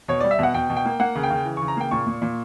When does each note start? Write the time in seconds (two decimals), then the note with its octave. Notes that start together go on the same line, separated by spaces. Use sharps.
0.08 B2 C#5
0.20 G3 D5
0.31 E5
0.39 B2 F#5
0.54 B2 G5
0.70 B2
0.76 G5
0.85 A#3
1.00 A#3 F#5
1.15 C#3
1.23 G5
1.30 C#3
1.45 E3
1.57 C#3 C#6
1.68 A#5
1.77 A#3 G5
1.91 A#2 C#6
2.07 A#2
2.22 A#2